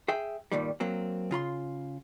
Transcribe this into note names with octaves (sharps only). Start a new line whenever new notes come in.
G#4 E5 G5
G2 A#2 D#3 G3
F#3 A#3 C4
C#3 F4 B5 C6